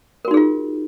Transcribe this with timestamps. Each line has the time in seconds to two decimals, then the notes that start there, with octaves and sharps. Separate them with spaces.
0.25 A#4
0.28 F#4
0.31 D#4
0.34 G#4
0.37 F4